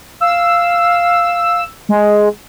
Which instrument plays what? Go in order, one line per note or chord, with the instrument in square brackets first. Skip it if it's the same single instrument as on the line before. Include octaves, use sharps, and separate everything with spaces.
[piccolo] F5 [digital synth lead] E6
[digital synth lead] G#3